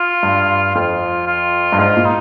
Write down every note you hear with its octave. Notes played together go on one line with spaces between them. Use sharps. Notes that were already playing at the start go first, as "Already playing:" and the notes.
Already playing: F4
G2
F2 F4
F4
G2
G#2 F4
A#2
D#4